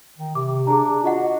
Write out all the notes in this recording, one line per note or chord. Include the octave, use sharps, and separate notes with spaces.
D#3
C3 D6
D4 G#4 A#5
F4 F#4 D#5 F#5